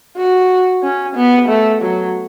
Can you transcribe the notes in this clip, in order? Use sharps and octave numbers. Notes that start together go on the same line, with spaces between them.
F#4
C#4
B3
A3
F#3